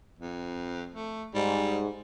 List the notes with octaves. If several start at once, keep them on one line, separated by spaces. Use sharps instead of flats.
F2
A3
G#2 G3